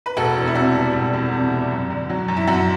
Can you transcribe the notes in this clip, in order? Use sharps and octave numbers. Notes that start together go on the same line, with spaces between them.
B4
E1 F#4 A4
E2
E4
C3 F#4
G3
E1
E2
C3
G3
F#2
D3
F#3
F#2
E4
F#2 F#4